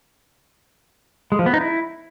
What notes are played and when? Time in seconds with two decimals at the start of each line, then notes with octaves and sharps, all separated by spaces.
1.32 G#3
1.39 F3
1.46 B3
1.54 D#4
1.61 E4